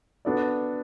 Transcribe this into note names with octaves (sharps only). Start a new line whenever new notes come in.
B3 D4 F#4 A4 D5